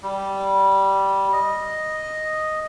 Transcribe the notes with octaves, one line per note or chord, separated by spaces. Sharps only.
G3
D#5